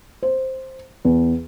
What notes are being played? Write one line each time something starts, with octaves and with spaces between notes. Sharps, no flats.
C5
E2